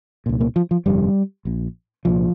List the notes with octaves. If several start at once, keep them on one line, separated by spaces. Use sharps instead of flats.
C2 A#2
A#3
F3
F3
G1 F2 C3 G3
A#1 A#2
C2 A#2 F3